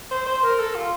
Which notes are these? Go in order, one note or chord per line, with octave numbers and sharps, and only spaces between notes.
C5
C5
A#4
A4
F4